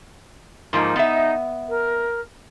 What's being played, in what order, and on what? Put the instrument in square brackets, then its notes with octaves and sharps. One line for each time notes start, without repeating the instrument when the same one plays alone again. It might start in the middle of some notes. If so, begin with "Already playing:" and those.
[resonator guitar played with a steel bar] G#2 F3 A#3 [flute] D#4
[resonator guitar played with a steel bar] B3 E5
[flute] A#4